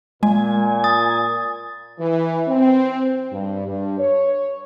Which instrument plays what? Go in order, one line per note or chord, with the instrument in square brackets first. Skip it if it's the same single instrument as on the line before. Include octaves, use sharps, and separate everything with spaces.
[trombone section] A#2 [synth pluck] G#3 [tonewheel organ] G#5
[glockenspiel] D#6 A6
[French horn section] E3
C4
G2
G2
C#5